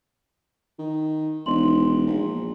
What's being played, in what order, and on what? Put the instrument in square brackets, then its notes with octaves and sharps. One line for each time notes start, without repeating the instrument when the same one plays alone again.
[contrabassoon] D#3
[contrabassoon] E1 [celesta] D#4 C6 F#7
[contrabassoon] A#1